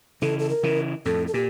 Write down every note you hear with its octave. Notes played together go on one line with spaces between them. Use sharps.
C#3 E3 A4
A4
A#4
C#3 E3
F2 A2 A4
A4
A#2 G4